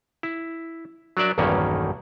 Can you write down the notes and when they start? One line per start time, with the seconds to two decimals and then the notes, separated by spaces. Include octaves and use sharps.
0.23 E4
1.17 F#3 D4 A#4 D5 E5
1.38 B1 E2 G2 D#3 A#3 C#4